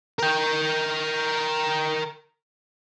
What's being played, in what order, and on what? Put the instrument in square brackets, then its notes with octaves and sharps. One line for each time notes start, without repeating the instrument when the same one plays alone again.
[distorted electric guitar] A#4 G5